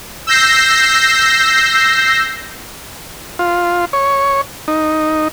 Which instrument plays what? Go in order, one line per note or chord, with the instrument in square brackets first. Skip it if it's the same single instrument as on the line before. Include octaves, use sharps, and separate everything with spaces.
[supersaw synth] E6 G6 A#6 C7
[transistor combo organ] F4
C#5
D#4